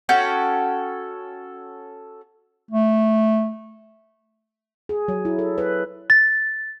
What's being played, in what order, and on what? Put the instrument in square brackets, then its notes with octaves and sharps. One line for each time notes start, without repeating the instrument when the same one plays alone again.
[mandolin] C#4 F#4 A4 G5
[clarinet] A3
[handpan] G#4
F#3
E4
A4
B4
[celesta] A6